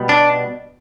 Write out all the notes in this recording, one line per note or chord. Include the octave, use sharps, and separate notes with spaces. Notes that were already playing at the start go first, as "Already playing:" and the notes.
Already playing: B2 G3 B3
D4